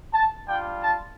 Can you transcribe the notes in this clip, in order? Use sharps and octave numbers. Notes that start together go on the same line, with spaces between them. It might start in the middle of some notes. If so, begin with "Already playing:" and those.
A5
G3 D4 F4 G5
A5